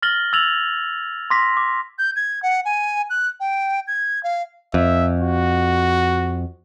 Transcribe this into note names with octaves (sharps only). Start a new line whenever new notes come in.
F6 A6 A#6 F#7 G7
E6 G#6 A6 F7 F#7
C6 D6 A#6 B6
D6
G6
G#6
F#5
G#5
F#6
G5
G#6
F5
F2 E5
F#4